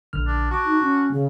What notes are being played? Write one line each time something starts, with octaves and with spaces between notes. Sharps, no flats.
A#1 D3 F6
D4
F#4 A5 D6
D#4
C#4
C#3